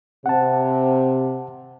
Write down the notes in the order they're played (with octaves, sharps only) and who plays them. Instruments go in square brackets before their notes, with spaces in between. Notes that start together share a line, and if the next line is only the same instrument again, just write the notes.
[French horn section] C3 [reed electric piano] F#5 A5